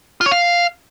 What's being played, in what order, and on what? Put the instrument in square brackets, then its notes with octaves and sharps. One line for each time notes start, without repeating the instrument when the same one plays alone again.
[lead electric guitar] F4
C#5
F5